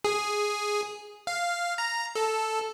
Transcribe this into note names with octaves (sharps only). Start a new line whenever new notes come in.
G#4
F5
A#5
A4